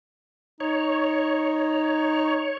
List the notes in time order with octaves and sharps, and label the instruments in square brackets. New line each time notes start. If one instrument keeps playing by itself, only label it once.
[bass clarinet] D#4 [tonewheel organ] C#5